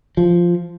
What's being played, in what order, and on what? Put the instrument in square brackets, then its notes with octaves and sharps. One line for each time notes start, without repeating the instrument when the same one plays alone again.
[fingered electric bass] F3